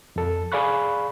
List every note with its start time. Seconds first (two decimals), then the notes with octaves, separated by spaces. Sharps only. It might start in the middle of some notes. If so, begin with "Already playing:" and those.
0.16 F2 A4
0.52 G#4 D5 F5 B5 C#6 F#6